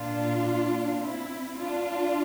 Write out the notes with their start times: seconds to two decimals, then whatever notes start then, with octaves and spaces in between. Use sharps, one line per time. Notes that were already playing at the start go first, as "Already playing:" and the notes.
Already playing: A#2 D4 F4
1.01 C4 E4
1.57 D4 F4